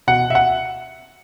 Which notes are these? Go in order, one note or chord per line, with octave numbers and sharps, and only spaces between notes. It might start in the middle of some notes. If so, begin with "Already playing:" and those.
B2 F#5
E5
F#5